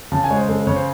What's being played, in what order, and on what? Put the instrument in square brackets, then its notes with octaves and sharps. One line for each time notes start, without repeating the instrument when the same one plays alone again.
[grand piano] C#3 A5
G#5
G#3 C#5
C5
C#3 A4
C5
C#3 C#5
C5